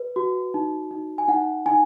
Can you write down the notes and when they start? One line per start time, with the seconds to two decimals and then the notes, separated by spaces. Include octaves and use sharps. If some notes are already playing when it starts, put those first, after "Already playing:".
Already playing: B4
0.16 F#4
0.54 D#4
0.91 D#4
1.18 G#5
1.28 D#4 F#5
1.66 D#4 G#5